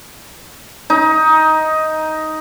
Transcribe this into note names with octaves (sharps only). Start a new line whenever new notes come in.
D#4